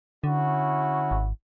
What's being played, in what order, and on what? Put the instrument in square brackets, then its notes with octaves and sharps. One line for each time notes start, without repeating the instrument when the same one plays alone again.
[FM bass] D3 [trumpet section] C#4 E4 F#4
[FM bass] G#1